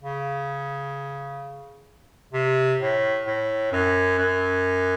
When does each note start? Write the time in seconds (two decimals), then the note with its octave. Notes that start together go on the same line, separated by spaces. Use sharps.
0.02 C#3
2.33 C3
2.80 A2
3.26 A2
3.72 F#2
4.18 F#2